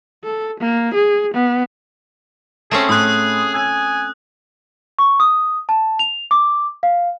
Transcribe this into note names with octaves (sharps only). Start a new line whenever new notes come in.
A4
A#3
G#4
B3
A3 C4 C#4 G#4
A2 G#4 C6 D#6 F#6
G#5 E6 G#6
C#6
D#6
A5
F7
D6
F5